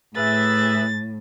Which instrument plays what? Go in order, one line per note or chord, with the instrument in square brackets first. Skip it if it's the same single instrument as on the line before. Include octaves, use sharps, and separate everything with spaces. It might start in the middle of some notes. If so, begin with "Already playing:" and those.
[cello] A2 [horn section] G#4 B4 E5 [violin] A6